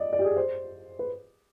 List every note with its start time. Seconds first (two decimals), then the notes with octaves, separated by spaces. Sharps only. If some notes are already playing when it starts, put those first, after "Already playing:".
Already playing: D5 D#5
0.13 D5
0.19 G4
0.25 G#4
0.37 C5
0.99 B4